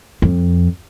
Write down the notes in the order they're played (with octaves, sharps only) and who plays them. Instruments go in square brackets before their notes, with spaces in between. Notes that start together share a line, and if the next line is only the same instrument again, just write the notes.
[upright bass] F2